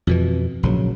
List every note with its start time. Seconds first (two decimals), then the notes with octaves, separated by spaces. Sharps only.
0.07 F2 B2 E3
0.63 A#1 C#3 F3 F#3